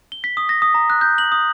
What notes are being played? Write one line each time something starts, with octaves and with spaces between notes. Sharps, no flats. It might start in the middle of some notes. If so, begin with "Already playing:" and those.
G7
B6
D#6
A#6
D#6
A#5
F#6
G6
F#7
D#6